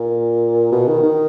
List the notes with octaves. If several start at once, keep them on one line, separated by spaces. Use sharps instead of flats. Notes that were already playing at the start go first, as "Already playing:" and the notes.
Already playing: A#2
B2
D#3
D#3